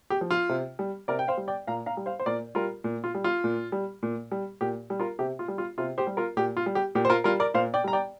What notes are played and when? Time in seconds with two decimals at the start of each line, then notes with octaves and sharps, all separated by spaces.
0.10 G4
0.21 F3
0.31 F4
0.49 C3
0.79 G3
1.08 C3 A#4 D5
1.19 G5
1.28 C5 F5
1.37 G3
1.48 D5 G5
1.67 A#2 F5 A#5
1.86 F5 A#5
1.97 G3
2.06 C5 F5
2.20 C5
2.26 A#2 A#4 D5
2.55 G3 F4 A#4
2.84 A#2
3.04 F4
3.15 G3
3.24 F4
3.44 A#2
3.72 G3
4.03 A#2
4.32 G3
4.61 A#2 G4
4.90 G3
5.00 F4 A#4
5.19 C3 G4
5.39 F4
5.48 G3
5.58 F4
5.78 C3 F4
5.98 G4 C5
6.07 G3
6.17 F4 A#4
6.37 A#2 G4
6.57 F4
6.66 G3
6.75 G4
6.95 A#2 G4
7.05 C5
7.10 F4 A#4
7.24 G3 F4 A#4
7.40 A#4 D5
7.54 A#2 C5 F5
7.74 D5 G5
7.84 G3 A#5
7.93 D5 G5